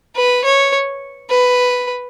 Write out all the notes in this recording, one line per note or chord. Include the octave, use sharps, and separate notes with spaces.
B4
C#5
B4